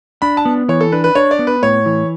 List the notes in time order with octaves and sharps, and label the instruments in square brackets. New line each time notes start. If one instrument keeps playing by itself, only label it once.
[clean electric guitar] D4 [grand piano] B5
[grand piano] A5
[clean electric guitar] B3
[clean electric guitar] E3 [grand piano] C#5
[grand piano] A4
[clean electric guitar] D4 [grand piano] B4
[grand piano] B4
[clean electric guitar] D4 [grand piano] C#5
[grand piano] D5
[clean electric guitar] B3
[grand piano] B4
[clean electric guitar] A2 [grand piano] C#5
[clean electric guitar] E3